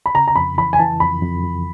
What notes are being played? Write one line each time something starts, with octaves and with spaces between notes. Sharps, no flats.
B5
C#3 A#5
A#5
F2 B5
E3 B5
G#5
E3 A5
F2 B5
F2
F2